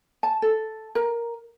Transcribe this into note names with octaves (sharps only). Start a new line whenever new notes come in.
A5
A4
A#4